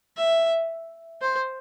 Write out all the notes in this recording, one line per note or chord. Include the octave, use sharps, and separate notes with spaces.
E5
C5